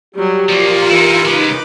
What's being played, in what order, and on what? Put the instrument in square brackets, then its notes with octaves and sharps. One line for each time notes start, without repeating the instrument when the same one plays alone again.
[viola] F#3 G3 [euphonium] G4
[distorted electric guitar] F3 A#3 [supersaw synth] F4 A#4 [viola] D5
[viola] E3 [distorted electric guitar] D#4 E4
[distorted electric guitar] C#3 G#3 [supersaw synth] D#4 [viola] B4 D6